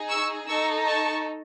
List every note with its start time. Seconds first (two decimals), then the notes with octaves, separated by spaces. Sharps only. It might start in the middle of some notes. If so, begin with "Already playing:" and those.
Already playing: D#4 G#4
0.09 C#6 E6
0.47 D#4 A4 C#6 E6
0.85 A5 C#6